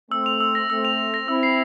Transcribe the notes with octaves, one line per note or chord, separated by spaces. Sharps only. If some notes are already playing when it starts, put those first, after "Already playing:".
A3 C4 E6
F7
E6
A#6
A3 C4 E6
F7
E6
A#6
C4 E4 E6
C7